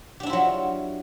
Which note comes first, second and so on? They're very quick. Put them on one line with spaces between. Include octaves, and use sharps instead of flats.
G4 D4 E4 F4 F#3